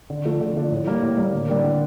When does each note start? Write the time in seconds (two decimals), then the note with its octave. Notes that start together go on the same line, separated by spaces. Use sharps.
0.10 D3
0.25 F3 A3 D4
0.41 D3
0.56 F3 A3 D4
0.71 A2
0.87 G3 A#3
1.02 A2
1.18 G3 A#3
1.33 D3
1.48 G3 D4 G4 A#4
1.64 D3